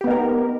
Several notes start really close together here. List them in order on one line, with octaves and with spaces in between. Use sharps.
G4 B3 D#4 A#4